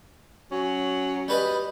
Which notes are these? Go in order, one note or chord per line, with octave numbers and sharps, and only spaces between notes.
F#3 C#4
G3 B4 D#5